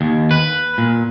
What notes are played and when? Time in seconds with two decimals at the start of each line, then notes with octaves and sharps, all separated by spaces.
0.01 D#2
0.31 B4
0.78 A#2